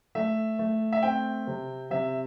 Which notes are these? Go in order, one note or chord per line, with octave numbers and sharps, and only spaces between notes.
A3 E5
A3
E5
C4 G5
C3
C3 E5